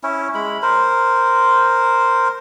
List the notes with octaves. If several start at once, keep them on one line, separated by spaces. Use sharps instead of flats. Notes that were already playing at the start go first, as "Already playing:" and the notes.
C#4 E4
G#3 E4 B5
A#4 C5